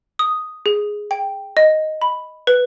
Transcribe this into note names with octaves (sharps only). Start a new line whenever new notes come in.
D#6
G#4
G5
D#5
B5
B4